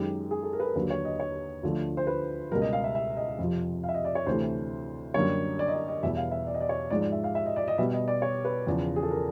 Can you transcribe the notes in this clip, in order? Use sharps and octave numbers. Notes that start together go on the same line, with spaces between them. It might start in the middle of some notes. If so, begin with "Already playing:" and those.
Already playing: F#2 D#3 G#3 G4
G#4
A4
A#4
B4
A#4
D#2 D3 F#3 A#3 B4
C#5
D#5
C#5
D2 D3 F3 A3
C5
B4
C#2 B2 G3 A#4
D#5
F5
E5
E5
D#5
F2 C3 F3
F5
E5
D#5
D5
C#5
D2 C3 E3 A3 C5
F#2 D3 G3 A#3 C#5
D5
D#5
D5
D#5
E2 B2 G3 B3 E5
F5
E5
D5
D#5
D5
C#5
G#2 F3 G#3 D5
D5
E5
F5
E5
D#5
D5
D#5
B2 G3 B3 E5
D#5
D5
C#5
B4
E2 C#3 F3
G#4
A4
A#4